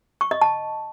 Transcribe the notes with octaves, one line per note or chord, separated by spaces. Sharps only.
C#6
D#5
A5